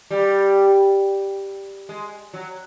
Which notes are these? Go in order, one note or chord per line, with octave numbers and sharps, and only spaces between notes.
G3
G#3
F#3